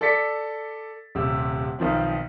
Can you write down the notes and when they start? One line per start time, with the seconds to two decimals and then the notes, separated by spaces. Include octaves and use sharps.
0.01 A4 D5 A6 B6 C#7
1.15 D#1 C3 E6
1.79 B1 D#3 F3 C4